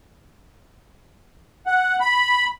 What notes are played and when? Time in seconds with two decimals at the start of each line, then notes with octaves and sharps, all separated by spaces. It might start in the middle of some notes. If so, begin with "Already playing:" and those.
1.67 F#5
2.01 B5